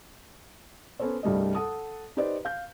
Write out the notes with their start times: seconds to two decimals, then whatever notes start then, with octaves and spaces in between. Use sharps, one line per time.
1.00 B3 C#4 A4 C5 C#5
1.23 C2 G2 G3 A3 G#4 D#5
1.55 A4 F#5 A5 D#6
2.17 D#4 G4 B4 C5 D5 D#5
2.45 F5 G6